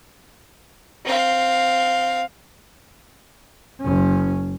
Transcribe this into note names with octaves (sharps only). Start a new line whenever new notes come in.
C4 F5
F#1 C#4